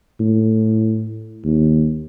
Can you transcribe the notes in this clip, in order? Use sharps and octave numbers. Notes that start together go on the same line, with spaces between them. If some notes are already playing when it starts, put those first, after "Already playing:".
A2
D#2